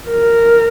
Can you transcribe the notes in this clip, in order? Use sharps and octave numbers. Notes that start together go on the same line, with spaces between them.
A#4